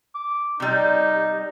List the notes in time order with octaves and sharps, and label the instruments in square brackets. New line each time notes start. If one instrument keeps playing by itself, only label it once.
[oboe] D6
[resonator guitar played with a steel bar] C3 G3 [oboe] D#4